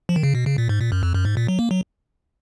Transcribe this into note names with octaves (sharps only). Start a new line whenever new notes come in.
F3
D#3
C#3
B2
C#3
A#2
G#2
A#2
F#2
F2
F#2
G#2
A#2
F#3
A#3
F#3